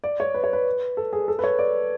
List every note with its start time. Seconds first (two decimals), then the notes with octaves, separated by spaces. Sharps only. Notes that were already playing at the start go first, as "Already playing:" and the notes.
0.04 D5
0.20 C#5
0.34 B4
0.44 C#5
0.53 B4
0.97 A4
1.13 G#4
1.28 A4
1.39 B4
1.44 C#5
1.59 D5